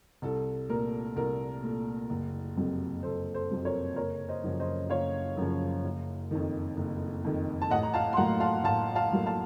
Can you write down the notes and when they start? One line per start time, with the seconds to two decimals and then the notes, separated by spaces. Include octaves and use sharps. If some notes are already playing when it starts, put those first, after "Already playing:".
0.22 C2 A4
0.69 A#2 A3 A#4
1.16 C2 A#4
1.63 A#2 A3
2.10 F#1
2.56 F2 C3 F#3 C4
3.03 F#1 A4 C5
3.34 A4 C5
3.50 F2 C3 F#3 C4
3.65 A#4 C#5
3.96 F#1 A#4 C#5
4.29 C5 D#5
4.44 F#2 C#3 F3
4.60 C5 D#5
4.90 F#1 C#5 F5
5.37 F#2 C#3 F3
5.84 F#1
6.31 F2 D#3
6.77 F#1
7.25 F2 D#3
7.62 A5
7.70 A1 D#5 F#5
7.83 A#5
7.94 F5 A5
8.13 C6
8.17 A2 F#3 A#3 F#5 A#5
8.40 F5 A5
8.64 A1 F5 A5
8.95 F5 A5
9.12 A2 F#3 A#3
9.26 F5 A5